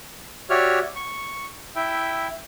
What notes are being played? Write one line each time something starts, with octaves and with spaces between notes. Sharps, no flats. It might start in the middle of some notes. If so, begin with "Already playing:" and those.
F#4 G4 C#5 D5 E5 F6
C#6
E4 E5 G5